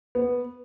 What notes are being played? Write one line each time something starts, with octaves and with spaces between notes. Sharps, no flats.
B3